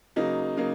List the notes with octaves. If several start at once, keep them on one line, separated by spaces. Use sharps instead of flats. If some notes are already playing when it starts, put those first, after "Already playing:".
C#3 F#3 A#3 D#4
C#3 F#3 A#3 D#4